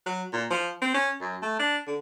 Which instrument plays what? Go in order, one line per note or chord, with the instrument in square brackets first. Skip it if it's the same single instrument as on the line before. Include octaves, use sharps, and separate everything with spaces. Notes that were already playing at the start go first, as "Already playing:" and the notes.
[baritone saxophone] F#3
A#2
F3
C4
C#4
F#2
A3
D4
D3